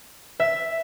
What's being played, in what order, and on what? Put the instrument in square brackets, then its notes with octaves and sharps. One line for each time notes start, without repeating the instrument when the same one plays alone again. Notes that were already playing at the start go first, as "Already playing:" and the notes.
[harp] E5